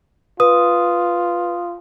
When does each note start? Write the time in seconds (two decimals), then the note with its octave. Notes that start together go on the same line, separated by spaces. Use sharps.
0.40 F4 B4 D#6